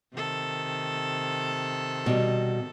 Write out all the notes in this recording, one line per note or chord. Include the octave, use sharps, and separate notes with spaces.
C3 D#3 A4
B2 G3